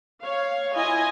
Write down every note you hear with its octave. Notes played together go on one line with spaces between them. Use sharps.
C#5 F5
E4 F4 D#5 G#5